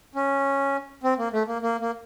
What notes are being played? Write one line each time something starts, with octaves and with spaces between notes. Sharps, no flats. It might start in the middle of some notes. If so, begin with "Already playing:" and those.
C#4
C4
A#3
A3
A#3
A#3
A#3